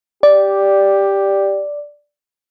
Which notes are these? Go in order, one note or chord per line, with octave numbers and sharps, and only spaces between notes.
G4 D5